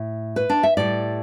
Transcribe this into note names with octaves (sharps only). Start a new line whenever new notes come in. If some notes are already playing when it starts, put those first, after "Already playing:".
Already playing: A2
B4
D4
E5
A2 G3 D5